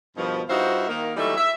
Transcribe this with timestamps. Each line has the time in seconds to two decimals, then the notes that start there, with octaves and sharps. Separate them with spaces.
0.16 G2 B2 D#3 F3
0.48 G2 D#4 F4 F#4 C5 E5
0.89 D#3 A#3
1.16 E3 F#3 G3 A3 D#4 E5
1.36 E5